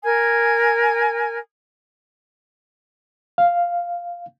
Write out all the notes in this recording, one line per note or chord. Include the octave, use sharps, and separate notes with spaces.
A#4 G#5
F5